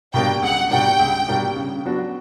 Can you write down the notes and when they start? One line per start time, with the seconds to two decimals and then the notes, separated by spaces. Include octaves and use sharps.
0.14 B2 G3 A#3 D4 G5
0.42 C#2 F#5
0.71 B2 G3 A#3 D4 G5
0.99 C#2
1.28 B2 G3 A#3 D4
1.56 C#3
1.85 F#3 B3 D4 F#4